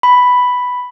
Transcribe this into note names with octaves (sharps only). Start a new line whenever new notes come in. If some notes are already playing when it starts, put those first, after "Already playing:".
B5